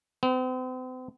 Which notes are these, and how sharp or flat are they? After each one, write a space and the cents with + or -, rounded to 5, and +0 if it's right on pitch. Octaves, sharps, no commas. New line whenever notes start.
C4 -40